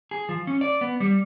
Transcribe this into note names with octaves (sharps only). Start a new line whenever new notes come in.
G#4
F3
C#4
D5
B3
G3